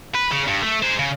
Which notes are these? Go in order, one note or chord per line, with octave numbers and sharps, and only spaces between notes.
B4
C#3
G2
A3
G#4 C5
C#3